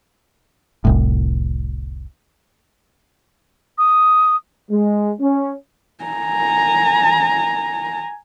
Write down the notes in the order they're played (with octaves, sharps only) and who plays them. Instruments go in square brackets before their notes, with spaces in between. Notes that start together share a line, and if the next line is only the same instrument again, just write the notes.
[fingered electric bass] F1 C2 A2
[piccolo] D#6
[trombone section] G#3
C#4
[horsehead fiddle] G#5 A#5